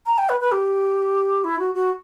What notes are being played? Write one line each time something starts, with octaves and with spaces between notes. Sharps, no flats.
A#5
G5
B4
B4
G4
E4
F#4
F#4